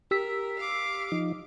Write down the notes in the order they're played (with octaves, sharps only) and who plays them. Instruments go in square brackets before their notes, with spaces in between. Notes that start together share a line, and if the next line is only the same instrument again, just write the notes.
[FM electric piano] G4 E6 B6 [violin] A#4
[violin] F5 D6
[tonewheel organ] F3 D#4